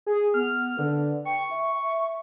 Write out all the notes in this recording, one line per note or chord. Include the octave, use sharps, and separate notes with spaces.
G#4
B3 F6
D3 B4
G5 C#6
E5
E5